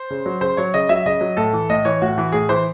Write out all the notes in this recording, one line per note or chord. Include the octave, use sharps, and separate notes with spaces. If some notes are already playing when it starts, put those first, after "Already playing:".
Already playing: C5
C#3
F#3
C#3 C5
F#3 C#5
C#3 D#5
F#3 E5
C#3 D#5
F#3
A2 A4
E3
A2 D#5
E3 C#5
A2 F#4
E3
A2 G#4
E3 C5